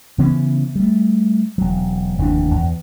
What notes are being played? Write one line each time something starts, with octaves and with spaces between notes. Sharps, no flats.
C#3 E3 B3 C#4
G3 A3
E1 F#3
F1 D#2 E3 D4
E2